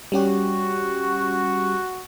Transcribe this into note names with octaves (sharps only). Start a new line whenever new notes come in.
G3 C#4 F#4 G4